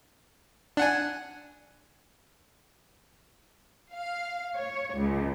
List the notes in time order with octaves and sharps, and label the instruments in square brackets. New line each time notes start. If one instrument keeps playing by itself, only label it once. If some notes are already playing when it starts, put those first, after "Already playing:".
[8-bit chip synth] D4 F#5 G#5
[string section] F5
C#5
C#2